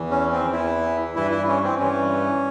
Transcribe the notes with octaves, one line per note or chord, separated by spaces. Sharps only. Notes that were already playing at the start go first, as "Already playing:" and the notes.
Already playing: E2 E3
C#4
C4
E2 E3 E4
G2 E3 E4
E4
C#4
C4
G2 E3 C#4